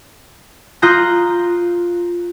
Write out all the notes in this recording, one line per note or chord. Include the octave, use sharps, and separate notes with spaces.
F4 A#5 D#6 F#6 G6 A#6